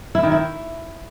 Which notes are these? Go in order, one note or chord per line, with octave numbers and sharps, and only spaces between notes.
E4
D#3
E4